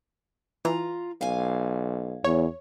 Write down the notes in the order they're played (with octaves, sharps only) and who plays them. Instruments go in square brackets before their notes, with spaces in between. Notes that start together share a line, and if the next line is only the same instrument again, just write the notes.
[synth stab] E3 [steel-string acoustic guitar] F4 A#5
[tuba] B1 [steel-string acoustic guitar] F5 G#5
[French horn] E2 [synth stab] C#5